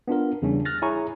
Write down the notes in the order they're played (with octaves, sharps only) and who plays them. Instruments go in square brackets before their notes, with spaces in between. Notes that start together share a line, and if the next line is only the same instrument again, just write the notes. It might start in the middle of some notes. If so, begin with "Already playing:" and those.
[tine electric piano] B3 D4 F4 A#4
E2 C#3 G3 C#4 D4
F6 F#6 A6 A#6
E4 G#4 C#5 G#5 A#5 C#6